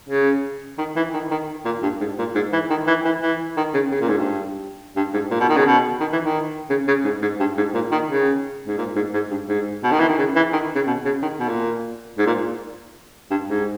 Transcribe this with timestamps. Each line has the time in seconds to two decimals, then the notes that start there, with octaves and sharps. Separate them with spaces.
0.09 C#3
0.78 D#3
0.96 E3
1.14 D#3
1.31 D#3
1.65 A#2
1.83 G2
2.00 G#2
2.19 A#2
2.35 G#2
2.53 E3
2.70 D#3
2.87 E3
3.05 E3
3.22 E3
3.57 D#3
3.74 C#3
3.92 C#3
4.01 A#2
4.09 G#2
4.18 G2
4.96 G2
5.14 G#2
5.31 A#2
5.40 B2
5.49 D#3
5.57 C#3
5.66 B2
6.00 D#3
6.12 E3
6.24 D#3
6.70 C#3
6.88 C#3
7.04 G#2
7.22 G#2
7.40 G2
7.57 G#2
7.74 A#2
7.92 D#3
8.10 C#3
8.67 G#2
8.78 A#2
8.96 G#2
9.14 G#2
9.31 G2
9.48 G#2
9.84 B2
9.92 D#3
10.00 E3
10.09 D#3
10.18 C#3
10.36 E3
10.53 D#3
10.75 C#3
10.87 B2
11.05 C#3
11.22 D#3
11.40 B2
11.48 A#2
12.18 G#2
12.27 A#2
13.31 G2
13.48 G#2